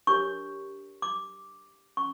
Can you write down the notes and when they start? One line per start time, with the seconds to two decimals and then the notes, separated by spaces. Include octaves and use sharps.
0.07 D4 G4 A#4 C#5 C#6
1.02 D6
1.97 C#4 C#6